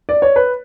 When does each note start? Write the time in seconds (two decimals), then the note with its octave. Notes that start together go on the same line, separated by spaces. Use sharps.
0.09 D5
0.22 C#5
0.36 B4